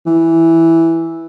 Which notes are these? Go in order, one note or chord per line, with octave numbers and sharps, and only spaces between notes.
E3